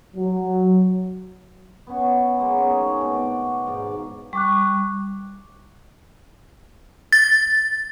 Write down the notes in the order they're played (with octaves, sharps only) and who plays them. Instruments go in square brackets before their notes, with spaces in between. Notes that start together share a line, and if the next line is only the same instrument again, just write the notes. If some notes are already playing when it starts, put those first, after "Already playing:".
[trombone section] F#3
[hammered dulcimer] B3 C#4 C#5
F#3 G#3 A#3
C4 C#4 D#4 G#4
B2 A3
F#4 D5
G#2 D#3 D5 F5
[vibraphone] G3 [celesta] C#6 D6 F#6
[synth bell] A6